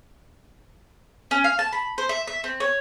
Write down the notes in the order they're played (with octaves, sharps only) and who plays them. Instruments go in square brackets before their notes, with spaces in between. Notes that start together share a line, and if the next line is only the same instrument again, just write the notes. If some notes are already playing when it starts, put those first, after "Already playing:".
[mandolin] C#4
F5
A5
B5
C5
E5
E5
C4
C#5